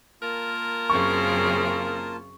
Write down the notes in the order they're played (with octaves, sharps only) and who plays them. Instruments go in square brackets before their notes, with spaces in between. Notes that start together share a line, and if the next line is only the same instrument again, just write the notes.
[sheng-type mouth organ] A#3 F4 A5 [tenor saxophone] A#4
[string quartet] F#2 C#3 C4 [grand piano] C#6